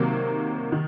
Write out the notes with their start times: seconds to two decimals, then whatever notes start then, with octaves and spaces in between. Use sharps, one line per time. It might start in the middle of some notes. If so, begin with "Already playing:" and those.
Already playing: C3 D#3 F#3 A#3
0.72 D#3